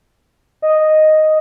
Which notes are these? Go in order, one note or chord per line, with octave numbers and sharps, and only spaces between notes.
D#5